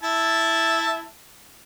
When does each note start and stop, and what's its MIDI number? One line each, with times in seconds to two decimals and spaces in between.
0.03 1.06 64
0.03 1.06 76
0.03 1.06 81